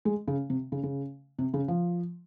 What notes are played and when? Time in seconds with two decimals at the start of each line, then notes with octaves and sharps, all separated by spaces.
0.05 G#3
0.28 C#3
0.50 C3
0.72 C#3
0.83 C#3
1.39 C3
1.54 C#3
1.68 F3